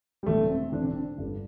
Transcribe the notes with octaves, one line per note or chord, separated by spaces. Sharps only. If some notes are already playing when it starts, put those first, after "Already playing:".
G3
E1 E2 D3 A3
C4
E1 E2 D3 D4
C4
D4
G1 G2 D3